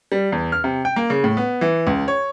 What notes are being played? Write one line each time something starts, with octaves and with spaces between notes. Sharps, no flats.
G3
E2
F6
C3
G5
A#3
C#3
A2
B3
E3
C#2
C#5